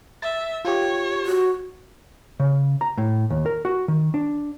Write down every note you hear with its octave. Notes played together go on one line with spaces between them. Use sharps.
E5 A6
F4 G4 C#5
F#4
C#3
A#5
A2
D#2
A#4
F#4
D#3
D4